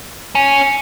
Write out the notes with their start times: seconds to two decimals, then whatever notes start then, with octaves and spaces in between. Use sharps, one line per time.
0.35 C#4